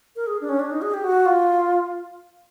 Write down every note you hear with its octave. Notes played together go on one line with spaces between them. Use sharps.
A#4
G#4
D4
C#4
D4
D#4
G#4
G4
F#4
F4